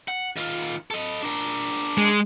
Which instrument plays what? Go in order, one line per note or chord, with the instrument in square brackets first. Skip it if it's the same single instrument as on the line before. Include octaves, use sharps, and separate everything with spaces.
[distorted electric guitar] F#5
D#3 F4
A4 D#5
D4 A#4
[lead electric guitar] G#3